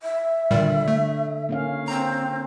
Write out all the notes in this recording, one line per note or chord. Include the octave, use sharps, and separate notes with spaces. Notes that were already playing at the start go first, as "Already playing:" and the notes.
E5
A#2 D3 D#3 G3
A3
A#3 C#4 F5
C4 A#5